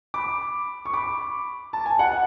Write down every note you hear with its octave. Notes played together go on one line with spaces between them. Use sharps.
B5 D6
C#6
B5 D6
A5
G#5
F#5